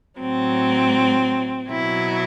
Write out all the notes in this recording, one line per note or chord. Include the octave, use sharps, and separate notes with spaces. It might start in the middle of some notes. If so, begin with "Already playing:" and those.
A2 F#3 C4
B2 F#3 E4